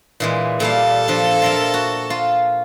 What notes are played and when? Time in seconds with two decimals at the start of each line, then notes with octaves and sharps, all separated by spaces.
0.20 A#2 E3 G#3
0.60 A#2 G3 A4 F5
1.08 F3 D4
1.42 F4 A#4 E5
1.74 F#4
2.10 F4